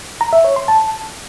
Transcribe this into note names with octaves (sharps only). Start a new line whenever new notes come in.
A#5
E5
C#5
C6
A5